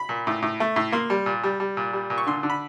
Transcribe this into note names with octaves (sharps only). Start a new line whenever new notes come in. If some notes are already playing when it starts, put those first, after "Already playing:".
Already playing: B5
A#2
A2
A2
A3
A2
A#3 C6
G3
A#2
G3
G3
A#2
G3
A#2
C#6
D3 C6
D3
B5